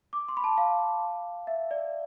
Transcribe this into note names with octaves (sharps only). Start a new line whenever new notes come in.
D6
C6
B5
A5
F5
E5
D5